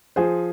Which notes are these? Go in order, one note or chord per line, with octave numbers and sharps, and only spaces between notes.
F3 G#4 C5